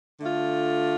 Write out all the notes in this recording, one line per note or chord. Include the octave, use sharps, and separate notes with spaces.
D3 A3 F4